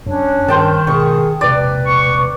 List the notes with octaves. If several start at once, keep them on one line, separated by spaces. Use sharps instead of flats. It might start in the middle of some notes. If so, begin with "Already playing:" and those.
F#2 C#4 D4 C#5
G2 D#3 C4 C5 G5 A5
G#1 B2 G#4 C#6 D#6
E1 A#1 C3 B4 D5
C#6